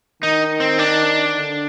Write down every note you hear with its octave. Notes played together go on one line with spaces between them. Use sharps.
D#3 D#4
C4
D4
D3